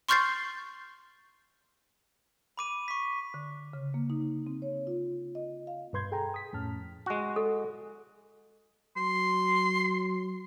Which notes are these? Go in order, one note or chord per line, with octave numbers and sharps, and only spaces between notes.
C6 C#6 F6 G6 A6 C7
B5 D6 D#7
C#6 B6
D3
C#3
A#3
D#4
C4
C#5
F4
D#5
F5
G2 B2 B4 C6 G6 G#6
G#4 A4 G5 G#5 A#5
D#6 B6
F2 A2 C#4 A5 F6
G#3 F#4
A4
F#3 C6